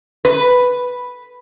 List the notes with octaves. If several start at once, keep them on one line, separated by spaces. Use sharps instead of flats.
B4